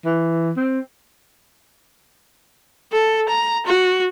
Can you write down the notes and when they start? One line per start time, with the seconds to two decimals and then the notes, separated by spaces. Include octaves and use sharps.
0.05 E3
0.57 C4
2.92 A4
3.29 A#5
3.66 F#4